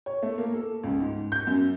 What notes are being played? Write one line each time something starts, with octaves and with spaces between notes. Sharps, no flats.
C#5
A3
A#3
A4
C#2
G#2
G6
F#2